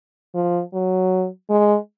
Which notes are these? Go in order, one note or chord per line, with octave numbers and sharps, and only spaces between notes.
F3
F#3
G#3